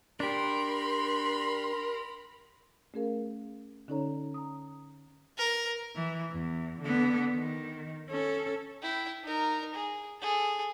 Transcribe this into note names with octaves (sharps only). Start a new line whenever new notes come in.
D4 G4 A#4 B5 C6
A3 C#4 G#4 A#4 F5
D3 C#4 D#4 A4 C#5 A#5
A#5 D#6
A#4
E3
E2
D3 B3
D#3
C#4 A4
E4 G5
D#4 A#4
G#4
G#4 A4